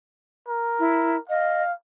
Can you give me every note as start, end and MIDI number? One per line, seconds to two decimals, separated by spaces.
0.48 1.19 70
0.79 1.16 64
1.29 1.63 75
1.29 1.73 77